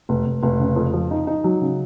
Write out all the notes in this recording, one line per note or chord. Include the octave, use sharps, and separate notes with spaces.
F1
F1
F1
C#3
F2
F3
D#4
D#4
F#3
C#3